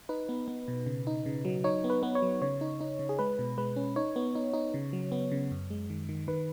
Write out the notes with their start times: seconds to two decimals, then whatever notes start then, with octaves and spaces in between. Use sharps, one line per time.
0.09 D#4 B4
0.29 B3
0.48 B3
0.68 B2
0.86 C#3
1.07 D#4
1.26 C#3
1.45 F#3
1.64 D#4 C#5
1.84 B3
1.90 B4
2.03 B3
2.15 C#5
2.22 F#3
2.42 C#3 C#5
2.61 D#4
2.81 D#4
2.99 C#3
3.09 G#4
3.19 G#3 B4
3.39 B2
3.58 G#3 B4
3.76 C#4
3.96 D#4 C#5
4.16 B3
4.35 D#4
4.54 D#4
4.74 C#3
4.93 F#3
5.12 B3
5.32 C#3
5.51 F#2
5.71 G#3
5.90 D#3
6.09 D#3
6.27 D#3 B4